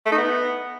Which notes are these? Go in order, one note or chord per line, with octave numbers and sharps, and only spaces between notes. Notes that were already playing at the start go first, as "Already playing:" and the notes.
A3
D#4
B3